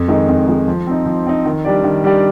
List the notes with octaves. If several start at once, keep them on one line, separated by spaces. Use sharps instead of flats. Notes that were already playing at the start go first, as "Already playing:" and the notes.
Already playing: F2
D#3 G#3 D#4
F2
D#3 G#3 D#4
F3
C4 D#4
F3
C4 D#4
D#3
G3 D4 G4 D5
D#3
G3 D4 G4 D5